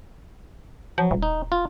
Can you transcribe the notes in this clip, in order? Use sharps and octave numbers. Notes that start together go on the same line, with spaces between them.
F3 F#3
D#1
D#4
F4